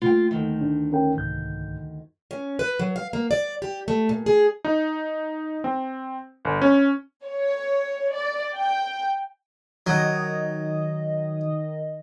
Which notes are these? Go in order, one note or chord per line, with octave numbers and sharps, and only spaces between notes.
A#2 A3 F4 G5
D2 D#3
D4
C#4 A#4 G5
C2 G#2 G6
C#4
B4
F#3
F5
A#3
D5
G4
A3
A#2
G#4
D#4
C4
G1
C#4
C#5
D5
G5
D#3 F#3 D#5